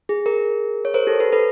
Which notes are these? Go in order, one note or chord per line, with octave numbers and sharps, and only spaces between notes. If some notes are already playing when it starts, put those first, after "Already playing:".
G#4
G#4 A#4
C#5
A#4 C5
G4 A4
A4 B4
A4 B4